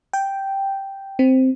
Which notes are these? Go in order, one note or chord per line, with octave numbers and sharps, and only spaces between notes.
G5
C4